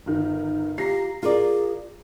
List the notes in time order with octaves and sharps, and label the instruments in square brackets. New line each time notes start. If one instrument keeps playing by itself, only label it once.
[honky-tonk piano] G1 D#3
[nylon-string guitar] F4 [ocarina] G4 [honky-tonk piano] A#5 A#6 C7
[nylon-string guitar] F4 A#4 D5 [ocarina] G#4